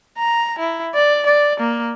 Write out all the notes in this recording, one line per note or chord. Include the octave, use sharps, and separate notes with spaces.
A#5
E4
D5
D5
A#3